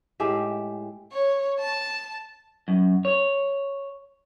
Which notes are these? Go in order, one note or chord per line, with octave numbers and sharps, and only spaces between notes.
A2 G#3 G4 E5
C#5
A5
F#2
C#5